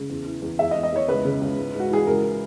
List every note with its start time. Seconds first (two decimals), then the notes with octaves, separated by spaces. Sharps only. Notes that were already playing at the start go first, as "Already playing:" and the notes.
Already playing: C#3
0.10 E2
0.26 E3
0.42 E2
0.59 E2 E5
0.71 D#5
0.76 E2
0.83 D#5
0.92 E2 C#5
1.08 C#2 B4
1.25 C#3
1.41 C#2
1.58 G#2
1.74 G#2
1.80 F#4
1.90 E3 G#4
2.07 C#2 A#4